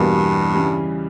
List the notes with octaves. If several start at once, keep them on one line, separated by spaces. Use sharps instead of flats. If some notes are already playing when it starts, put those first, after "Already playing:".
Already playing: E2 G2 B2 G3 A#3
C#3 E3 G3